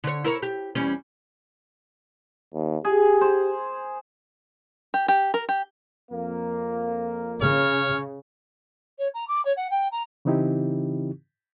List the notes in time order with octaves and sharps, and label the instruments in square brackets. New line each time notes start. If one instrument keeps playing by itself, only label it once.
[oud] D3 C#5
E4 A#4 C#5
G4
E2 G3 C#4
[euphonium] D#2
[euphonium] G4 [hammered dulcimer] G#4
[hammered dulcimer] C5
[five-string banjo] G4
G4
A#4
G4
[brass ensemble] F2 A#3
[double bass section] C#3 [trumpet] C#5 [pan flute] F6
[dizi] C#5
A#5
D6
C#5
F#5
G5
A#5
[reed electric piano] C#3 E3 C4 D#4 E4 G4